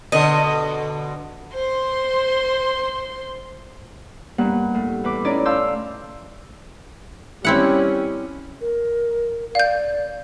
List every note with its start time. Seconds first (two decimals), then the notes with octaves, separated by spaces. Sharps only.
0.12 B2 D3 D#5
1.53 C5 C6
4.38 G2 A#3 B3 F#5
4.74 A2
5.04 E2 B4 D6
5.24 C#4 D#4 E4 C#5 D5
5.45 F5 A5 C6 E6 G6
7.45 G3 C4 C#4 E4 F#5
8.61 A#4
9.55 D5 F5 G6